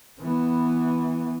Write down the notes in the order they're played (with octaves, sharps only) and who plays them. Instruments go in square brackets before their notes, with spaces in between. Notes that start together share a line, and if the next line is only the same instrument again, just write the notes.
[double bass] E3 B3